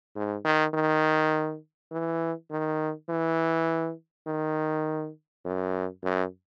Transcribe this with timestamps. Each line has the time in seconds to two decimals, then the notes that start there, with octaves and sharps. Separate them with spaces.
0.15 G#2
0.44 D#3
0.74 D#3
1.91 E3
2.51 D#3
3.09 E3
4.27 D#3
5.45 F#2
6.03 F#2